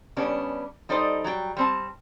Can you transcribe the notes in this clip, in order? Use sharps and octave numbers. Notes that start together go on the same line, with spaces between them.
C#3 G3 B3 C#4 D4
G3 D#4 A4 C5 D5 D#5
F#3 G3 G5
G3 C4 A5